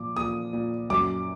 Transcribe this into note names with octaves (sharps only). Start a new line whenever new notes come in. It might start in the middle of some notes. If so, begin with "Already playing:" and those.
Already playing: A#2 F3 D6
A#2 D#6
A#2
F#2 D6